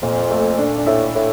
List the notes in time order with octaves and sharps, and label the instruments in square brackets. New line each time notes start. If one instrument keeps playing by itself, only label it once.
[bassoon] F2 [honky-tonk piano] A#2
[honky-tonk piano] A3
D4
D4
[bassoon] A2 [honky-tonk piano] E4
[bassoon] A2